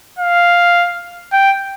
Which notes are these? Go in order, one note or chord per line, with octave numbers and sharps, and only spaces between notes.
F5
G5